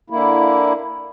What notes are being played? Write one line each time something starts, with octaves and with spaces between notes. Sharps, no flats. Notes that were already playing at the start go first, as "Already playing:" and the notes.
D3 A#3 E4